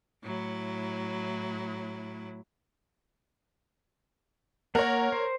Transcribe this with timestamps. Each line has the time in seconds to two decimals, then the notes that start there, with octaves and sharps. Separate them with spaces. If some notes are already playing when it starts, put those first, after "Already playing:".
0.22 A2 F#3 E4
4.75 A#3 A#4 C#5 F#5 A#5
5.12 C5